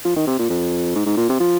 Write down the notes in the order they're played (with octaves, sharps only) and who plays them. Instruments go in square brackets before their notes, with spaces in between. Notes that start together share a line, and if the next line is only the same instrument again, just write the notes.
[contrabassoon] F3
D#3
C3
A#2
F2
G#2
G#2
A#2
C3
F3